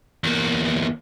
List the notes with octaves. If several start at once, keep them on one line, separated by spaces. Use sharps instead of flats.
E2 A#3